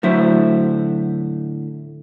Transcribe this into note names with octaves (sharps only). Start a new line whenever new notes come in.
A2 D3 F#3 C5 E5